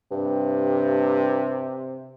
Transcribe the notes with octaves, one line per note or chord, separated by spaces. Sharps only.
G2 C3